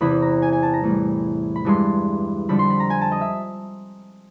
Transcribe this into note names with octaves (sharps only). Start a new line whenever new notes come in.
E2 C3 E3 B5
A#5
G#5
G#5
A5
A#5
A2 E3 G3
B5
G2 E3 G#3 C6
F2 D3 G3 B5
C6
B5
A#5
G#5
A5
D#5
E5